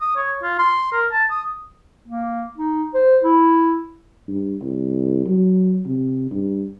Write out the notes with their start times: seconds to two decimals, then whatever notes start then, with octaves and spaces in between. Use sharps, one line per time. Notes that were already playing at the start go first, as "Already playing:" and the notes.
0.01 D#6
0.16 C#5
0.43 F4
0.59 C6
0.92 A#4
1.12 A5
1.30 D#6
2.08 A#3
2.57 D#4
2.94 C5
3.23 E4
4.28 G2
4.62 C2
5.26 F#3
5.86 C3
6.31 G2